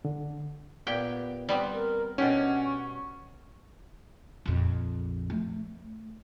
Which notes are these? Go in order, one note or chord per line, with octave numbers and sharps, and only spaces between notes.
D3
A#2 B3 G4 G5
G3 B3 C4
A#4
B2 C#4 D4 G4 F#5
C#6
A#1 F2
A3